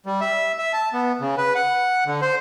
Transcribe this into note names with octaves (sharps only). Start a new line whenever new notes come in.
G3
E5
E5
A5
B3
C#3
B4
F#5
D3
C5